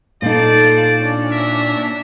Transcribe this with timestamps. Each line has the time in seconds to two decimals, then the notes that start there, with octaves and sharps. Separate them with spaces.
0.22 A#2 D#4 A4 C5 D5 F5
0.98 C#4 D4
1.32 A#4 E5